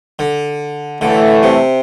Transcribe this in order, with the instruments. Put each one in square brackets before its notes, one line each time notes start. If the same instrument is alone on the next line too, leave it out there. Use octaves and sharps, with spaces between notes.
[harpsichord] D3
[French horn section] A2 E3 A3 [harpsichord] D3
[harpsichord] C3